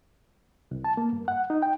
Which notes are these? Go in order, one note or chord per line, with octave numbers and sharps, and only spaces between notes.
C2
A5
A#3
G2
F#5
D#4
G5